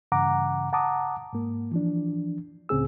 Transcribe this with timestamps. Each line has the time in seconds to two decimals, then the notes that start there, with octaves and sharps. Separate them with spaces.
0.12 G2 C#3 E3 F#5 A#5 D6
0.73 F#5 A5 A#5 D6 D#6
1.33 G#2 A#3
1.71 E3 F3 D4
2.69 C#2 A2 C#3 C4 G#4 E6